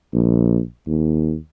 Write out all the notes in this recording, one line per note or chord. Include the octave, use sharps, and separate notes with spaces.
A#1
D#2